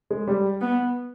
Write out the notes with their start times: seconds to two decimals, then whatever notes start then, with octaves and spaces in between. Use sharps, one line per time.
0.11 G#3
0.28 G3
0.61 B3